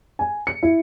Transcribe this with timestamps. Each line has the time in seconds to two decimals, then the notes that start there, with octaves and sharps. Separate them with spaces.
0.19 G#5
0.47 C#7
0.63 E4